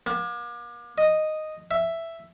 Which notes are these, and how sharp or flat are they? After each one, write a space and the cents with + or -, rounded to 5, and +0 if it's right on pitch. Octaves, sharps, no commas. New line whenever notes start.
A#3 +40
D#5 -5
E5 +5